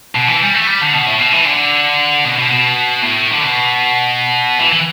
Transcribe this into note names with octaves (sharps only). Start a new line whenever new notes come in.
B2
E3
G3
A3
G3
D3
B2
A2
B2
E3
D3
B2
B2
B2
A2
D3
B2
E3
E3